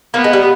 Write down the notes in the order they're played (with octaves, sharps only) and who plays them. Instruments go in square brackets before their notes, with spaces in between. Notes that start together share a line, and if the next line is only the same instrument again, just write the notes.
[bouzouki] A#3 [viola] B3
[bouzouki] G#3
G3